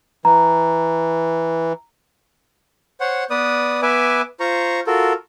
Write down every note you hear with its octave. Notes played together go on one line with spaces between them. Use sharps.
E3 A#5
C5 C#5 F#5
B3 B4 D5 D#6
B3 B4 E5 G#5 D6
F4 C5 A#5 C#6
F4 F#4 A4 A#4